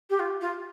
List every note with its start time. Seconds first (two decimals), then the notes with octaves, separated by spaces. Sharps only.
0.10 G4
0.19 F4
0.41 F4